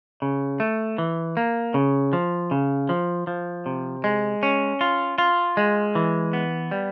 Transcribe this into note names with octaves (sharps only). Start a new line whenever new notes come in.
C#3
A3
E3
A#3
C#3
F3
C#3
F3
F3
C3
G#3
C#4
F4
F4
G#3
E3
B3
G3